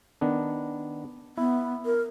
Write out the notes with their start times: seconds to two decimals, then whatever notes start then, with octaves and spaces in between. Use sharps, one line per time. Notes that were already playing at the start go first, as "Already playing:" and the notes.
0.21 D#3 B3 D4
1.38 B3 E4
1.85 A#4